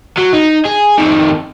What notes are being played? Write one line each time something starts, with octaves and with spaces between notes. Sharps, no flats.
F#3
D#4
G#4
F2 D#3